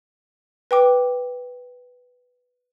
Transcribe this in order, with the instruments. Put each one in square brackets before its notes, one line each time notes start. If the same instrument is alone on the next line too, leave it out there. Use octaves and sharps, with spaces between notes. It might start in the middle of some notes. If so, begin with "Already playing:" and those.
[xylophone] B4 G5 D6